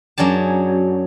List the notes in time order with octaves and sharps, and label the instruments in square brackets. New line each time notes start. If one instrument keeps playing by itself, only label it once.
[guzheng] F#2 F#3 D4 G#4 A5